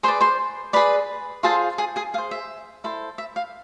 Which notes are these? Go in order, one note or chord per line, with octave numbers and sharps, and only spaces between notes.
G#4 B4 C5 D5 C6
C5 C6
G#4 B4 D5 B5
F4 G#4 A4 C5 A5
G#4 G#5
G#4 G#5
G#4 C5 F5
E5
E4 A4 C5
E5
F5